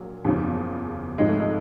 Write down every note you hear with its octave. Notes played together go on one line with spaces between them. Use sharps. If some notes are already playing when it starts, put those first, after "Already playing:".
Already playing: A#1 A#2 F#3
F#1 E2 C#3 F3
G#1 G#2 F3 G#3
A3
G#3